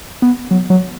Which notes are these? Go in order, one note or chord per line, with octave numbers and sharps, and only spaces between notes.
B3
F#3
F#3